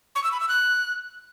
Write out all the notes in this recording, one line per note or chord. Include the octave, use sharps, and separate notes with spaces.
C#6
E6
B5
E6
F#6